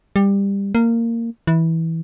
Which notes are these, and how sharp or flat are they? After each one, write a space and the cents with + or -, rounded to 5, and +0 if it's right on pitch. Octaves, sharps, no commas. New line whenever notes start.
G3 +20
A#3 -15
E3 -15